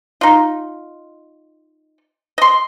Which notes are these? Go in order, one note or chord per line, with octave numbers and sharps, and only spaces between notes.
D#4 F4
D#5 C6